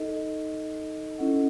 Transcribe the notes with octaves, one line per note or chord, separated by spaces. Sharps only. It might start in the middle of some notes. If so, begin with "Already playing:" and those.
Already playing: D#4 A4 D#5
C#4 E4 A4 D#5 F#5